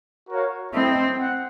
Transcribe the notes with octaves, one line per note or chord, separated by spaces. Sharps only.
F#4 A#4 C#5 F5
C4 E4 A4 C5 D#5 G5
F#5